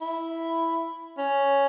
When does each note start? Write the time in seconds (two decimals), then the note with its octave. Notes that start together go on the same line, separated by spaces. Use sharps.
0.01 E4
1.18 C#4